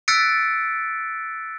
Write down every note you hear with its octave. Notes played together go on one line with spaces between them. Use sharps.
E6 F#6 A6 B6 C#7 D7